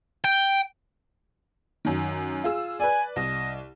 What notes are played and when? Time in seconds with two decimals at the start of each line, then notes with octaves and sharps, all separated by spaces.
0.24 G5
1.85 F#2 D#3
2.44 F4 G#4 E6
2.80 B4 D5 G#5
3.16 C2 D#5